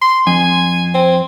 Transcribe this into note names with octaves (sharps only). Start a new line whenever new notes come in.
C6
F2 G#5
C4